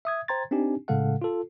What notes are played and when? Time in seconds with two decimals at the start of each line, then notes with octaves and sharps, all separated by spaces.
0.05 E5 D#6 G#6
0.28 C5 G5 A#5 C6 G#6 A6
0.51 C4 D4 D#4 G4 G#5
0.88 A2 C#3 G#3 A4 F5 F#5
1.22 F4 A4